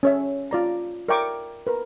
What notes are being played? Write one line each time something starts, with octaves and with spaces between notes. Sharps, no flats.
C#4 C#5 E5
F4 D5 A#5
A#4 D5 E5 G5 C#6 D6
A#4 B4